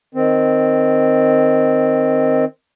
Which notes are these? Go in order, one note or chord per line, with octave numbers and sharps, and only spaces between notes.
D#3 C4